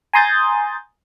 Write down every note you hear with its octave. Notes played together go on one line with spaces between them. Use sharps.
G#5 A#5 C6 D#6 G6 A6